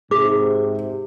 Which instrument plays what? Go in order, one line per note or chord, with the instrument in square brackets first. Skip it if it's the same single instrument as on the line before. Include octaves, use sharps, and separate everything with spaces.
[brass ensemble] G#2 C3 [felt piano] G#4 [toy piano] D6